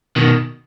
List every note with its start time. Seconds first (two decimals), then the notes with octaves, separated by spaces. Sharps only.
0.16 B2 D#3